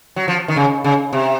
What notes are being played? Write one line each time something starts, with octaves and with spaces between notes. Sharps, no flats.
F#3
F3
D#3
C#3
C#3
C3